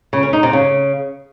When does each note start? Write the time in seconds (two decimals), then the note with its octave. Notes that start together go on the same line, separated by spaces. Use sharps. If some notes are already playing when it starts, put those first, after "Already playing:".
0.13 C#3
0.23 C#4
0.33 D#4
0.43 C3
0.53 C#3